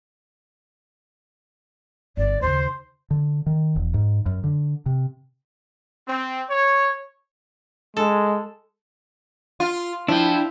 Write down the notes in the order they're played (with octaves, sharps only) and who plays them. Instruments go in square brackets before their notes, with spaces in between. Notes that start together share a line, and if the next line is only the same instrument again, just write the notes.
[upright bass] G1 [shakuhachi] D5
[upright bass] D#2 C#3 [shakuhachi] C5
[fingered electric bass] D3
D#3
E1
G#2
F#2
D3
C3
[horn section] C4
C#5
[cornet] G#3 [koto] A4
[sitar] F4
[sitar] F3 [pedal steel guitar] D4 G5 [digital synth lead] E4 [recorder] A5